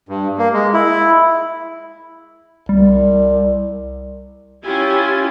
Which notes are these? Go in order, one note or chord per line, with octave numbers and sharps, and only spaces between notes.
G2
A#3
G#3
E4
C2 G3
C#4 E4 F4 G4 G#5